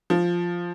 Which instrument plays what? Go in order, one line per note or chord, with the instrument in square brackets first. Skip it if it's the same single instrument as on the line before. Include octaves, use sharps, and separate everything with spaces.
[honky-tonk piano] F3